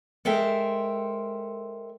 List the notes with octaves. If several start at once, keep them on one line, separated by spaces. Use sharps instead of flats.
G#3 A4 A#4 C5 E5 G5